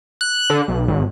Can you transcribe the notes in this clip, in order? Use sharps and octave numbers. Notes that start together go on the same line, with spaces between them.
F#6
D3
B1
G#1